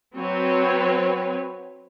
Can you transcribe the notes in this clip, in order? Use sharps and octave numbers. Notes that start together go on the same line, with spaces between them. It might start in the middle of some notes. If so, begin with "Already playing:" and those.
F#3 C4 B4 C#5